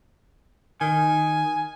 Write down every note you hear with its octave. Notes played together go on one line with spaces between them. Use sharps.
D#3 G#5